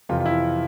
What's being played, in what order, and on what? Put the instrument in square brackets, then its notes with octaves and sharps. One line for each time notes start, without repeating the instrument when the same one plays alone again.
[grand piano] F2 C3 E3 F4
F4
E4